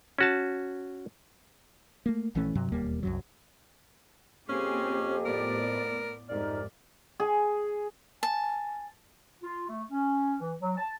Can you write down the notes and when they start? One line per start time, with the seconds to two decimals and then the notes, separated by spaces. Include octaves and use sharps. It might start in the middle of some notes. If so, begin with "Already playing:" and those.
0.19 C#4 F#4 A5
2.06 A3 A#3
2.35 A#1 E3 A3 C#4
2.55 G2 C3 F#3
2.72 E1 D#2 G3 A#3
3.03 C2 F#2 F#3
4.49 F2 A#3 C4 C#4 G4 G#4
5.26 A2 B3 A#4 D5
6.29 C2 F2 G#2 D#4 D5 F6
7.20 G#4
8.23 G#5 A5
9.42 F4
9.68 A3
9.91 C#4
10.40 E3
10.61 F#3
10.78 A5